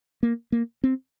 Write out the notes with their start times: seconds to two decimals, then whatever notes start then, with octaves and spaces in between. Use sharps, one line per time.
0.23 A#3
0.52 A#3
0.84 C4